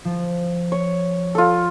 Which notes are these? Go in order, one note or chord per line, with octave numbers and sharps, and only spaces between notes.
F3
C#5
F4 A4